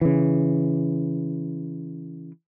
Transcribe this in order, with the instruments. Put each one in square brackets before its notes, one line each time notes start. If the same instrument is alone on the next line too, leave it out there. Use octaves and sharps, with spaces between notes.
[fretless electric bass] C#3 E3